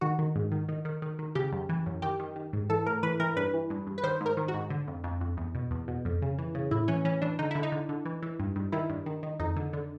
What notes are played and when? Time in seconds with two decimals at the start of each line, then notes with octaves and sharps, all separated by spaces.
0.01 D#3 F#4
0.19 D#3
0.36 G#2
0.52 D#3
0.68 D#3
0.85 D#3
1.02 D#3
1.19 D#3
1.35 C#3 G4
1.52 F#2
1.69 E3
1.86 F#2
2.02 D#3 G4
2.19 D#3
2.36 D#3
2.53 G#2
2.70 E3 A4
2.86 A2 A#4
3.03 E3 B4
3.20 E3 A#4
3.37 G2 B4
3.54 E3
3.70 G2
3.87 G2
3.98 B4
4.03 D#3 C5
4.21 G#2
4.26 A#4
4.37 D#3
4.48 F#4
4.54 G#2
4.70 D3
4.87 F2
5.04 F2
5.21 F2
5.37 E2
5.55 B2
5.71 E2
5.88 B2
6.05 F2
6.22 C#3
6.38 E3
6.55 C#3
6.71 A2 E4
6.88 E3 C#4
7.05 E3 C#4
7.22 E3 D4
7.39 D3 D#4
7.51 D3 E4
7.63 D#4
7.72 D3
7.89 D3
8.05 E3
8.22 E3
8.39 G2
8.56 G2
8.72 D#3 E4
8.89 G2
9.06 D#3
9.23 D#3
9.40 F2 D#4
9.56 D3
9.73 D3